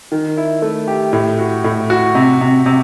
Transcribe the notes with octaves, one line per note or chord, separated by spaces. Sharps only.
D#3
E4
A3
G4
A2
F#4
A2
F#4
C3
C3
C3